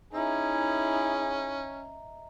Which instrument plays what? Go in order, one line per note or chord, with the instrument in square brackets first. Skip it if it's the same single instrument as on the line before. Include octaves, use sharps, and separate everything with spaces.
[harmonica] C#4 [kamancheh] D#4 E4 [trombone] G#4 [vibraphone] D#5 E5 A#5